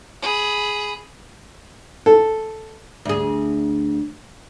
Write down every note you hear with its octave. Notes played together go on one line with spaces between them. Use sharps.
G#4 B5
A4
D2 G#4